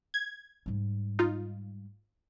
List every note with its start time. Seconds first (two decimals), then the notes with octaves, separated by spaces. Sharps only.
0.14 G#6
0.66 G#2 G3
1.19 D#4 F4